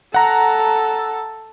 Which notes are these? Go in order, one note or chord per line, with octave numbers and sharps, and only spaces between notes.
A4 F#5 A#5